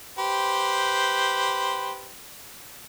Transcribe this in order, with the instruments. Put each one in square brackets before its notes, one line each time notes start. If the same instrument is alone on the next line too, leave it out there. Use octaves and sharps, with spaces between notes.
[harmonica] G4 B4 C5